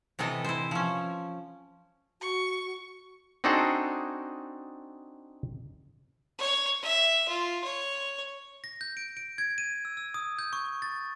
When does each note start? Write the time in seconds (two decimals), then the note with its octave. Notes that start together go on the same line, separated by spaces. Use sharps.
0.19 C3 E3 B3 A4 D#5
0.45 E4 C5
0.71 F3 C#4
2.22 F#4 C#6
3.44 C4 D4 D#4 F#4 G#4 A4
6.39 C#5
6.82 E5
7.28 F4
7.63 C#5
8.64 A#6
8.81 G6
8.97 D7
9.17 D7
9.38 G#6
9.58 D#7
9.85 E6
9.97 E6
10.14 D#6
10.39 G6
10.53 C#6
10.82 A6